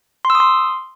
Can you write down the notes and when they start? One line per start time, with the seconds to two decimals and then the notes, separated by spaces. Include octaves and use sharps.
0.25 C6
0.30 E6
0.35 D#6
0.40 C6